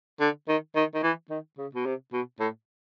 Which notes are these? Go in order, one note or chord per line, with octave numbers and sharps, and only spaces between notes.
D3
D#3
D#3
D#3
E3
D#3
C#3
B2
C3
B2
A2